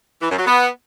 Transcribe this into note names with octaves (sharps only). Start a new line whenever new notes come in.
E3
F#2
F#3
B3